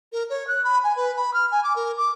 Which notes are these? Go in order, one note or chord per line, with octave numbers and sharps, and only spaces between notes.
A#4
C#5
F#6
B5
G#5
B4
B5
F6
G#5
D6
A#4
D6